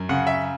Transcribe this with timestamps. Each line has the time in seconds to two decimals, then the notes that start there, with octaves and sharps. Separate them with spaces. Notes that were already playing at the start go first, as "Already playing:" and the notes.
Already playing: F#2
0.09 C#3 F#5
0.27 E5